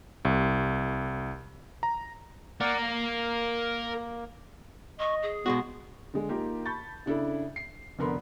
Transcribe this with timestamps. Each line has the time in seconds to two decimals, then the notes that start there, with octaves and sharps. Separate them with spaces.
0.25 C2
1.83 A#5
2.61 A#4 D5 F5 F#5
2.82 A#3
4.99 D#5 C#6
5.22 G#4
5.46 B2 G#3 B3 F#4
6.14 D3 G#3
6.29 A#3 D#4 F4 G4 A#4
6.66 A5 B5 C#6 G6 A6
7.06 C#3 D4 E4 A4
7.56 C7
7.99 F1 D3 B3 A#4 B5 C6